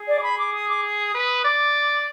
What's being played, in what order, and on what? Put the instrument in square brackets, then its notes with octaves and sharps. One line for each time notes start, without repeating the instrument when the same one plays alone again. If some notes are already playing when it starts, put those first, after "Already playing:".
Already playing: [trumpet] G#4
[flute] D5
D6
B5
D6
D#6
D6
D#6
[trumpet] B4
[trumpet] D5 [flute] D6